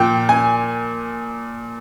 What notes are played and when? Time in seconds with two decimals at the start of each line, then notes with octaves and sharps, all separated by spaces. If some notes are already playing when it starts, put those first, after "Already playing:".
Already playing: A#2 F3 G5
0.29 G#5